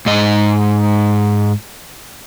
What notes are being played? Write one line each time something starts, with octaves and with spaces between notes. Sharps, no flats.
G#2 D#5